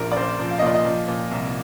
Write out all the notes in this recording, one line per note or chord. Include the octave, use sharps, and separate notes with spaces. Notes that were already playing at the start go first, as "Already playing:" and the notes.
Already playing: A#1 A#2 F3 A#4
D5
A#1 C5
F3
F5
D#5
A#2 D5
D#5
F3
A#2
C2